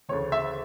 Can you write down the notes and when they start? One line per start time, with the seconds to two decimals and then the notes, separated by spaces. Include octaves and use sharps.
0.09 D2 C#3 E3 C#5
0.32 E5